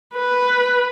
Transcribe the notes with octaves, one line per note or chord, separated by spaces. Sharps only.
B4